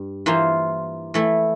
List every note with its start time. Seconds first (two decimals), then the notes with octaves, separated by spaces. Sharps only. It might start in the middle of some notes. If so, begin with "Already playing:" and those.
Already playing: G2
0.26 E3 A#3 F4 C5
1.14 E3 A3 E4